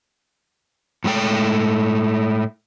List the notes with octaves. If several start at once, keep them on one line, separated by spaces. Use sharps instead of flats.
A2 G#3 A3 G5